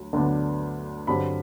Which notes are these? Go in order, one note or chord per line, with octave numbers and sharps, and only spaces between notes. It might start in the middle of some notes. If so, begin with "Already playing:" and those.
Already playing: D2 F#3
D2 D3 F#3 B3 D4
G2 D3 F#3 C4 B5